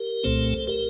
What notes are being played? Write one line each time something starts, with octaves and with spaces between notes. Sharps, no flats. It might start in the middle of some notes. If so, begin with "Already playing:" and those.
Already playing: G4 A#4
C2 A#2 A3 C4 A4 C5
G4 A#4